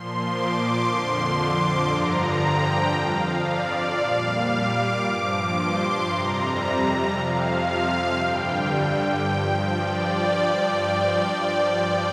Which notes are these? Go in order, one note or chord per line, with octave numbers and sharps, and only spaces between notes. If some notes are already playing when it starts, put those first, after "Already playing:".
Already playing: A#2 F3 C6
D6
F2 D3 F3 C6
D6
G2 D3 F3 A#5
G5
F2 F3 F5
D5
A#2 G3 F5
D6
G2 F3 D6
C6
F2 C3 G3 A#5
F2 C3 F3 F5
F5
G2 D3 G3 G5
G5
G2 F3
D5